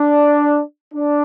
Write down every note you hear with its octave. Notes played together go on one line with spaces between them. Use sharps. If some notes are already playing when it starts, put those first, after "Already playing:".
Already playing: D4
D4